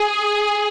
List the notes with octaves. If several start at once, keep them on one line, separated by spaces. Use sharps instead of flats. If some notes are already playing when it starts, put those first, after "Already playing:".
Already playing: G#4